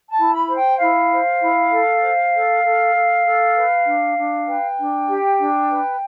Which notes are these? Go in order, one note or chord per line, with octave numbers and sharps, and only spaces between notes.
A5
E4
B5
C5
G5
E4 F5
C5
E4
A4
C5
A4
A4
A4
A4
B4
D4
D4
B4 G5
D4
G4
D4
B4